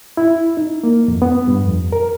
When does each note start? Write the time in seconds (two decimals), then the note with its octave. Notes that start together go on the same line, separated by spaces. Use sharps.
0.17 E4
0.57 D#4
0.83 A#3
1.08 F2
1.22 B3
1.47 G2
1.64 F2
1.92 A#4